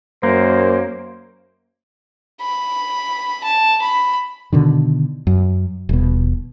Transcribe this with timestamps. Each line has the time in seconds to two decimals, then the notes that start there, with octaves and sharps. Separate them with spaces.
0.23 F#2 A#3 C5
2.42 B5
3.44 A5
3.82 B5
4.53 B2 D3 D#3
5.27 F#2
5.89 D#1 B2